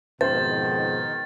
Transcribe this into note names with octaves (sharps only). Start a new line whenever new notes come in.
F2 G#2 B2 D#3 C5 A6